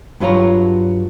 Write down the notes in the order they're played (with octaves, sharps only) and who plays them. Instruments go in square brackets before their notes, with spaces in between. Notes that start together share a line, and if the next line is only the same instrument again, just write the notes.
[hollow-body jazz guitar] G2 F#3 A3 F4 C#5 A#5